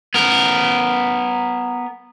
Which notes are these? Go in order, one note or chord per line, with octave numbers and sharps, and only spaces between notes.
B3 A#4